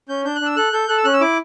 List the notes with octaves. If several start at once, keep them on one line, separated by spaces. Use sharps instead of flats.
C#4 G6
D4 G6
F#6
D4 E6
A4 F#6
A4 G6
A4 F#6
E6
C#4 F#6
E6
E4 D6